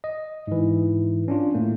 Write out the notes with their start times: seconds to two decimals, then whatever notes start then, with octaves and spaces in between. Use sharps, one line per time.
0.04 D#5
0.47 G#2 E3
1.28 C#4 D4 F4
1.55 A2 A3 A#3